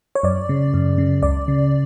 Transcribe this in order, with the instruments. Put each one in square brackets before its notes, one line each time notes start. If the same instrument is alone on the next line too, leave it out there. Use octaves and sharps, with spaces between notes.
[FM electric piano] C#5
F#2 D5
C#3
F#2
C#3
C#2 D5
C#3